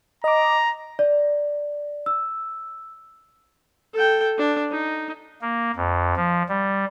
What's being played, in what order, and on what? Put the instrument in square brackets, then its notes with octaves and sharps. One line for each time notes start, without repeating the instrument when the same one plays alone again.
[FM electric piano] D#5 D6 [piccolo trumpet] A#5
[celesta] D5
E6
[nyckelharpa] A4 G5
D4
D#4
[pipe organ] A#3
F2
F3
G3